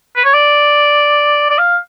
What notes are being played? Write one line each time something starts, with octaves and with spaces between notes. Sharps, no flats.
B4
C#5
D5
D5
F5